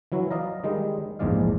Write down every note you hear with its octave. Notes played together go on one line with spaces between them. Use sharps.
E3 F#3 E4 F#4
D5 D#5 F5 A#5
D#3 G3 G#3 D#4
A#1 E2 G#2 G#3 D5 F5